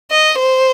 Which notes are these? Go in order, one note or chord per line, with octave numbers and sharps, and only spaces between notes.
D#5
C5